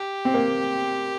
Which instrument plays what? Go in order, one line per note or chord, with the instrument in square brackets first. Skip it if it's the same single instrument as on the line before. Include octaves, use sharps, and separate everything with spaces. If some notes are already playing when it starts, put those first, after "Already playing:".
Already playing: [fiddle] G4
[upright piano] C4
A#3